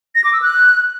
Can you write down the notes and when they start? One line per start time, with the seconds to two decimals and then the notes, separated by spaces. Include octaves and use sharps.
0.15 A#6
0.24 D6
0.33 E6
0.42 F#6